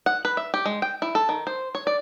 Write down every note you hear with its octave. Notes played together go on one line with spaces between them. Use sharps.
F#5
B4
E5
G4
G#3
G5
E4
A4
D#3
C5
C#5
D5